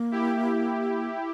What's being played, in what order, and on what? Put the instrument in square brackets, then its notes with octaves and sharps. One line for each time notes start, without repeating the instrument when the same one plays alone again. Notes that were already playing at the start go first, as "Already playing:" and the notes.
Already playing: [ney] A#3
[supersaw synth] E4 G4